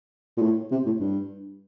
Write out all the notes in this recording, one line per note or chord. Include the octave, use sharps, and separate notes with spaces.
A#2
A2
C3
A2
G2